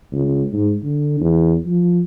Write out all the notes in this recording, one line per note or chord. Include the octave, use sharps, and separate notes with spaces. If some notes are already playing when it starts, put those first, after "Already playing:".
C#2
G#2
D3
E2
F3